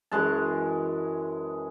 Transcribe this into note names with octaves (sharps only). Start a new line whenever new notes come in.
F#2 E3 G#3 A5